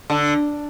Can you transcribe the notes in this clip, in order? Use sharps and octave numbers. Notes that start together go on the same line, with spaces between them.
D3